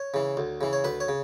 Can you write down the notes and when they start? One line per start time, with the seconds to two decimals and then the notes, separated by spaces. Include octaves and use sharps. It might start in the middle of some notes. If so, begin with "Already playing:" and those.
Already playing: C#5
0.14 C#3 E3
0.37 D2
0.61 C#3 E3
0.73 C#5
0.84 D2 B4
1.00 C#5
1.08 C#3